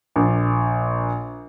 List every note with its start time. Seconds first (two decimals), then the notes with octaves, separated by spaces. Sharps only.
0.16 A#1